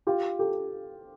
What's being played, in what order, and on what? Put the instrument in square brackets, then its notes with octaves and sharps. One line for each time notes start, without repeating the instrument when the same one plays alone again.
[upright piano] F4 G4
G4 A4